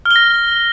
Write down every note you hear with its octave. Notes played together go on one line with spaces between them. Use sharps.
F6
G7
A#6